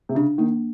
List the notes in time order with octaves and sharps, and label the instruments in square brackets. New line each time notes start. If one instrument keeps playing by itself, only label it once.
[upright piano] C3
[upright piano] C#3 [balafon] D4
[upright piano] D#3 [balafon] A#3